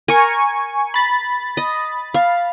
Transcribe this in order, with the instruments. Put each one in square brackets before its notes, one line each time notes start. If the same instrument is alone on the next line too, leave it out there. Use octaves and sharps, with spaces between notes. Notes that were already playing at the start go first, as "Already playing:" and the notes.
[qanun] A#4 [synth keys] G#5 C#6
[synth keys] B5 A6
[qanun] D#5
F5